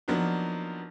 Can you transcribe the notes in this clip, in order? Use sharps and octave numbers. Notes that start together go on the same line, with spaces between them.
F3 F#3 A#3 B3 D4 D#4